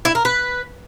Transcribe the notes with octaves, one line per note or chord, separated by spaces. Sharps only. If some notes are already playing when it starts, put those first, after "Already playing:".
E4
A#4
B4